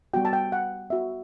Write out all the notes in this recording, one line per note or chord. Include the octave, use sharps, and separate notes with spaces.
G3 B3 F#4 G5
A5
G5
F#5
B3 F#4 E5